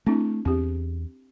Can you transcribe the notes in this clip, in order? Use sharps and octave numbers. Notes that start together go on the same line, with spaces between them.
A3 C4 D4 E4
E2 C4 G4